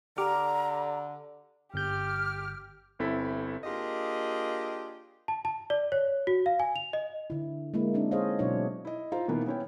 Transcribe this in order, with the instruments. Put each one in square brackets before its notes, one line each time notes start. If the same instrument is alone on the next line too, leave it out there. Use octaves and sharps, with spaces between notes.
[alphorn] D3 [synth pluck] G4 D6 F6 [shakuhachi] A#5
[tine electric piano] G1 G6 [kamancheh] G4 [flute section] F6
[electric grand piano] G1 C4 E4 A4 B6
[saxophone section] A#3 D4 F4 G4 G#4 D#5
[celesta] A5
A5
D5
C#5
F#4
F5
G#5
F7
D#5
[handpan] D3 E4
G#3 A#3 E4
A#3 C4 D4 D#4
G#4 A4 C5 C#5 D#5 F5
B2 F#3 D4 E4 C#5
[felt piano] E4 D#5
E4 F4 C5 F5 A#5
B2 E3 A#3 B3 D#4
B3 C#4 E4 C#5 G5